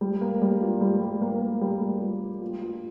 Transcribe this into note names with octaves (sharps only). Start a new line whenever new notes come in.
G3
A#3
G3
F4
G3
G3
A#3
A#3
G3
G3
F4
A#3
F4
F4